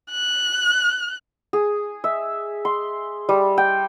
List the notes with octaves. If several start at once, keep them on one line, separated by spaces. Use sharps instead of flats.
F#6
G#4
E5
C6
G3
G5